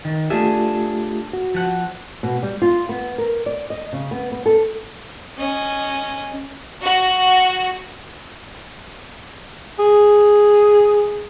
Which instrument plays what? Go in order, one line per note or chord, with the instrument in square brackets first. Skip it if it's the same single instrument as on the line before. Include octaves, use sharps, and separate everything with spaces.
[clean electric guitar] D#3
[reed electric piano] A3 F4 G4 [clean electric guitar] D4 G#4 E5
[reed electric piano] F#4
[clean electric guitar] F3 F#5
[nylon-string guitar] B2
G3
F4
B3
A#4
D5
D#5
C#3
B3
B3
A4
[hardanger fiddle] C#4 D#5
[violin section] F#4
[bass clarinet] G#4